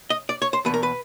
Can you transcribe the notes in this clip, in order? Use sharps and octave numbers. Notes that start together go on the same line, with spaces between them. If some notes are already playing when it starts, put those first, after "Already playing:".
D#5
D5
C#5
C5
E2 B2 B4
A#4
B4